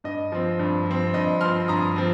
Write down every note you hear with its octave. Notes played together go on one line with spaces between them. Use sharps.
G2 D#5
F3 C4
G2
F3 C4
G2 D#5
F3 C4 C6 F6
G2 A#5 D#6
F3 C4